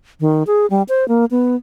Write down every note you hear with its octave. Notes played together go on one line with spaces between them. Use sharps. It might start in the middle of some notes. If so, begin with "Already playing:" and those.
D#3
G#4
G3
C5
A#3
B3